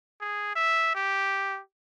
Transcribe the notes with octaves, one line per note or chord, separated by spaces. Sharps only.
G#4
E5
G4